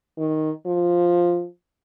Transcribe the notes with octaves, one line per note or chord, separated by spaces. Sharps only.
D#3
F3